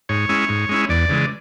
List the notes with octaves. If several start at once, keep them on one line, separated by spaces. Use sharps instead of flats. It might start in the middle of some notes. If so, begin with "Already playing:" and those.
G#2 C#5
G#3 C#4 E4
G#2
G#3 C#4 E4
E2 D5
C#3 E3 G#3